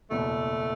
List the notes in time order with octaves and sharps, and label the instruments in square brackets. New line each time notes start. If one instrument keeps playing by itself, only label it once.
[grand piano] F#1 E2 B2 [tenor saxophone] A3